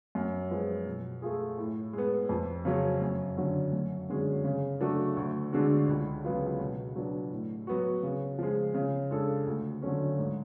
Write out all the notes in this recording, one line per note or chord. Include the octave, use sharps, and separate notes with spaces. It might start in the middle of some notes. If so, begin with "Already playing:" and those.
F#2
F3 G#3 B3
B2
A3 F4 G#4
A2
G#3 B3
F2
C#3 F#3 C#4
F#2
D3 F#3 C#4
F#2
D3 G#3 C#4 F#4
C#3
F#3 A3 D4 F#4
D2
D3 G#3 D4 F#4
C#2
C#3 F#3 B3 F4
B2
F#3 B3 D4
A2
F#3 B3 F#4
C#3
F3 G#3
C#3
G#3 D4 F4 A4
D2
D3 F#3 A3 C#4
G#2